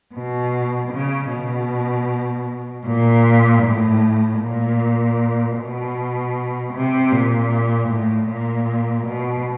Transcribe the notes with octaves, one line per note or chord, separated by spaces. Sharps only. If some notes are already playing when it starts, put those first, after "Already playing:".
B2
C#3
B2
A#2
A2
A#2
B2
C3
A#2
A2
A#2
B2